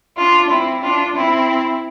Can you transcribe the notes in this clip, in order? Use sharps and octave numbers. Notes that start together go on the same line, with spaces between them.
D4 F4
C4 E4
D4 F4
C4 E4